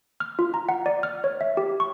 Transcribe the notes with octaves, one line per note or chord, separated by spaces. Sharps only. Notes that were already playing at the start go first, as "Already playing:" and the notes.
F6
F4
A#5
F#5
D5
F6
C#5
E5
G4
C#6